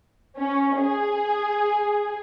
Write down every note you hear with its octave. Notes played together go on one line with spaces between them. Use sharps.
C#4
G#4